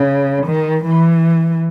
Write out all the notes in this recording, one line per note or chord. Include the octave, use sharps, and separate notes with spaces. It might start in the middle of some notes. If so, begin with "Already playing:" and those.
Already playing: C#3
D#3
E3